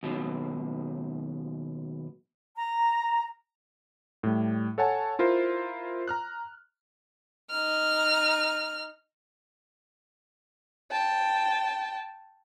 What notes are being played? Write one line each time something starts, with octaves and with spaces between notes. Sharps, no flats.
D#2 B2 F#3
A#5
A2 G3
A4 C#5 F#5 G#5 A5
E4 F4 A#4 C5
A#5 F6 F#6
D#4 F6
G5 A5